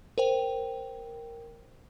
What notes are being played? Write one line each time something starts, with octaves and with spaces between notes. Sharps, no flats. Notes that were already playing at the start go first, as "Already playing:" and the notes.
A#4 C5 G5